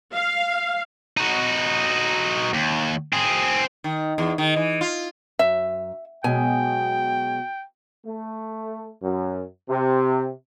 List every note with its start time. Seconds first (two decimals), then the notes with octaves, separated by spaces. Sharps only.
0.13 F5
1.17 D#4 F#4
2.54 D#2
3.13 C4 G#4
3.84 D#3
4.18 E2
4.38 D#3
4.56 E3
4.81 F4
5.39 F#2 E5
6.24 B2 F#3 G#3 G5 G#5
8.05 A3
9.02 F#2
9.69 C3